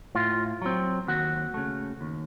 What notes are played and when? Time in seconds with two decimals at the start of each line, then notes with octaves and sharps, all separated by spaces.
0.15 A2 F4
0.62 F#3 C4
1.08 D#2 F#4
1.54 C#3 A3
2.01 D#2